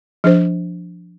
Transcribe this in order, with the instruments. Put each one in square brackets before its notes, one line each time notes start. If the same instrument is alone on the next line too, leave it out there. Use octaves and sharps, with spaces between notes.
[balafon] F3 D4 C5